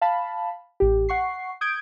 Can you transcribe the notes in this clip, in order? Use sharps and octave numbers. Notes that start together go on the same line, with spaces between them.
F5 A5 B5
A1 G4
F#5 C#6 C7
D#6 G6 G#6 D7